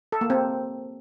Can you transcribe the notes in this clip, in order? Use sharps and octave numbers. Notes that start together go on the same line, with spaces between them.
A4
A#3
C4